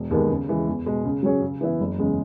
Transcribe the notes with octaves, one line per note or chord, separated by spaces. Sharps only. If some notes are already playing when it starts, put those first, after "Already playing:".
Already playing: E1
D#2 D#3 G#3 B3
C#3
E3 G#3
E2
B2 G#3
C#3
F#3 C#4 G#4 C#5
C#3
E3 B3 E4
F#1
E2 C#3 G#3